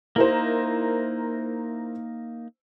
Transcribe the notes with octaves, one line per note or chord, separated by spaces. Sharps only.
A#3 D#4 E4 A#4 C5